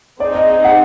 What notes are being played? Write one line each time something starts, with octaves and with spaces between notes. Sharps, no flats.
C4 D#4 G#4 D5
D#5
D#5
F#5